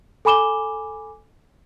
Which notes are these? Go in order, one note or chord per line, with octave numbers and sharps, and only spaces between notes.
A4 G#5 B5 D6 E7 G7